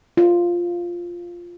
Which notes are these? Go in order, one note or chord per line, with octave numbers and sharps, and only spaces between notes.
F4